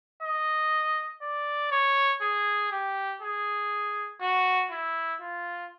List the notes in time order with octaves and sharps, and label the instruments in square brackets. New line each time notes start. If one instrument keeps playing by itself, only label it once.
[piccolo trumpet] D#5
D5
C#5
G#4
G4
G#4
F#4
E4
F4